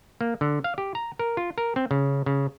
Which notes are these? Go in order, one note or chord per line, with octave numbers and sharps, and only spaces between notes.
A#3
D3
F5
G4
A#5
A#4
F4
A#4
C4
C#3
C#3